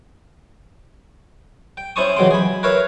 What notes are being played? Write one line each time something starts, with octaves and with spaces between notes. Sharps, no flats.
G5
C#4 E4 C5 A5 C#6 D#6
C#3 E3 F#3 G#3 G5 C6
G#4 B5
A#4 B4 C#5 E5 F5